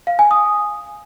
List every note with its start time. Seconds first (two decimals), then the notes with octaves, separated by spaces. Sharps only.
0.07 F5
0.19 G#5
0.31 D#6